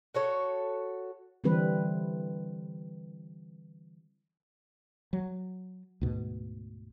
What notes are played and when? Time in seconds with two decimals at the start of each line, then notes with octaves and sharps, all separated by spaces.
0.14 F#4 A4 C#5
1.44 D3 E3 G3 C4 B4
5.13 F#3
6.01 D2 G#2 B2